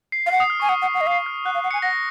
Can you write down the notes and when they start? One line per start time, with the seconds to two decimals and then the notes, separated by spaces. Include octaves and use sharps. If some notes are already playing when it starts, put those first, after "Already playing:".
0.12 C7
0.26 F5
0.32 F#5 C7
0.40 D#6
0.50 F6
0.60 G#5 C#6
0.69 F#5 D#6
0.82 F#5
0.94 F#5
1.01 D#5
1.07 F5 D#6
1.26 F6
1.45 F#5 F#6
1.54 F5
1.64 F#5
1.71 G#5 C#7
1.82 F#5 A#6